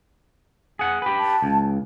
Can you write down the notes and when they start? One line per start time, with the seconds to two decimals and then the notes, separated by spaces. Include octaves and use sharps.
0.79 G#4 F#5
1.02 G4 B4
1.20 A5
1.42 C#2